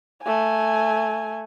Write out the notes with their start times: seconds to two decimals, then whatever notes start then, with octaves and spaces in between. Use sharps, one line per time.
0.23 A3 G#5